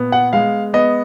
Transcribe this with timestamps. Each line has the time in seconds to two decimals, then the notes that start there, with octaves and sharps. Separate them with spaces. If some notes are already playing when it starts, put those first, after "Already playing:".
Already playing: A#2 B3
0.12 F#5
0.33 G#3 F5
0.74 B3 D#5